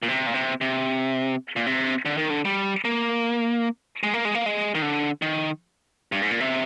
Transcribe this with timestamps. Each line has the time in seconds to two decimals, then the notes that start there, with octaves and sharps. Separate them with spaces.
0.03 A#2
0.08 C3
0.26 A#2
0.34 C3
0.61 C3
1.56 A#2
1.66 C3
2.05 D3
2.17 D#3
2.30 D3
2.45 G3
2.85 A#3
4.03 G#3
4.14 A#3
4.25 G#3
4.35 A#3
4.46 G#3
4.75 D#3
4.82 D3
5.22 D#3
6.12 G2
6.22 G#2
6.31 A#2
6.40 C3